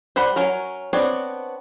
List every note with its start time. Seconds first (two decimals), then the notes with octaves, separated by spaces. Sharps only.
0.16 G3 C5 F#5 B5
0.36 F#3 C#4 A#4
0.93 B3 C4 D4 C#5